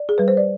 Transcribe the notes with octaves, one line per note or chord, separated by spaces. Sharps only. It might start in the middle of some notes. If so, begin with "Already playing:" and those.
Already playing: D5
G#4
G3 B4
C5
D5